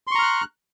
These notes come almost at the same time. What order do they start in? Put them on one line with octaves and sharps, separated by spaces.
C6 C#6 A#5 F6 F#6